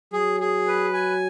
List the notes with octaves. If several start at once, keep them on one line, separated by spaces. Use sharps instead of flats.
F#3 G#4
G#4
B4
G#5